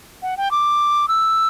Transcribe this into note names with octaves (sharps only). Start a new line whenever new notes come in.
F#5
G5
D6
E6